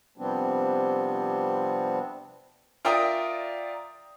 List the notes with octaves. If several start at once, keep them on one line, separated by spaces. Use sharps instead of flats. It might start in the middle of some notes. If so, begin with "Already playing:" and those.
C3 F3 G3 B3 C4 D4
F4 A#4 D5 E5 G5 D#6